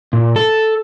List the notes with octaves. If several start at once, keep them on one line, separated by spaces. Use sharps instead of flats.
A#2
A4